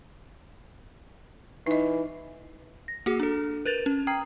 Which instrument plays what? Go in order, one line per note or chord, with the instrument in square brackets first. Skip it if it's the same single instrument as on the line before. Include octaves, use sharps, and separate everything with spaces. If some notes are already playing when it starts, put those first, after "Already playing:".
[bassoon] E3 [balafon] D#4 D#5
[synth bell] A#6
A#3 F#4 G#4
D4 A4
A#4 B4 A6 F7
C#4
G5 A#5 D#6 F6 G#6 C7